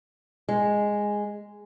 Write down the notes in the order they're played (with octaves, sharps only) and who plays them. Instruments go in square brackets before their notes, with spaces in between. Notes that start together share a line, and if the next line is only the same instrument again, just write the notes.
[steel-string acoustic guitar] G#3